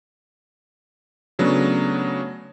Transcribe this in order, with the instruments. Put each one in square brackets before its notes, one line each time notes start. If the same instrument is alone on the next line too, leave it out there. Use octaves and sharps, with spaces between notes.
[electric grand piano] C#3 F#3 A3 B3 D4